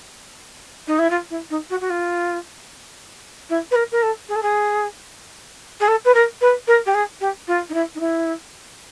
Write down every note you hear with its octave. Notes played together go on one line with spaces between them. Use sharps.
D#4
E4
F4
E4
D#4
F#4
F#4
F4
E4
B4
A#4
A#4
A4
G#4
A4
G#4
G#4
A4
B4
A#4
B4
A#4
G4
G#4
G4
F4
D#4
E4
D#4
E4